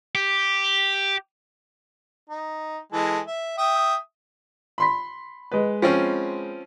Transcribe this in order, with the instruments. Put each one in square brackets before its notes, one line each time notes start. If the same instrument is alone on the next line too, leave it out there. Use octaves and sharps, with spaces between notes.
[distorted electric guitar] G4
[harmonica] D#4
E3 G#3 A4
E5
E5 G5 D#6
[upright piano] B5 C6 B6
G#3 B4
[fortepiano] F3 C4 C#4